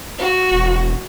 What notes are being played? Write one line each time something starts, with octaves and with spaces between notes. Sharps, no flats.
F#4
E1